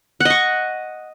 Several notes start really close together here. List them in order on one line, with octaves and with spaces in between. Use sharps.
F#5 D#5 C#6